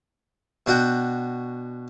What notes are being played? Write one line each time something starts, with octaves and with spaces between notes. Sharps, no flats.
B2 D4 F#4 F#5 G5